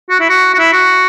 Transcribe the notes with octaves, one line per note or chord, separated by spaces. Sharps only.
F#4
E4
F#4
F#4
E4
F#4